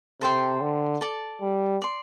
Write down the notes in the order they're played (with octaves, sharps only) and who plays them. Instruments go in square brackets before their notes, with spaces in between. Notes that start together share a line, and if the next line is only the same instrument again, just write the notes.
[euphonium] C3 [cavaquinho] A4 C5 G5 C6
[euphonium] D3
[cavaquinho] A4 D5 A5
[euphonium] G3
[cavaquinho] D5 C6